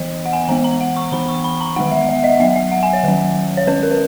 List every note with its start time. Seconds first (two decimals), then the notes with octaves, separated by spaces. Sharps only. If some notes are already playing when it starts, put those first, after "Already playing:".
Already playing: E3 B3 D#5
0.26 F#5
0.33 G#5
0.48 E3 G#3 B3 A#5
0.64 A#5
0.81 F#5
0.96 C#6
1.12 E3 B3 B5
1.28 C#6
1.44 B5
1.61 A#5
1.76 D#3 G#3 B3 F#5
1.92 E5
2.09 E5
2.24 D#5
2.40 F#3 B3 E5
2.56 E5
2.72 F#5
2.83 G#5
2.93 C#5
3.04 D#3 F#3 C#4
3.57 C#5
3.67 D#3 G#3 C#4 B4
3.83 A#4
3.92 B4